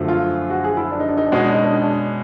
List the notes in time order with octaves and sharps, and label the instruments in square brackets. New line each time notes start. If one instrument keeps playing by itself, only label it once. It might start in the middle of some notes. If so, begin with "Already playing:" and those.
Already playing: [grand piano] F#2 D3 F3 A3
[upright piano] F4
F#4
G#4
E4
D4
D#4
D4
D#4
D4
[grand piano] B2 G#3 C#4 F#4 [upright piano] D#4
[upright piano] D4
D#4
D4
D#4
D4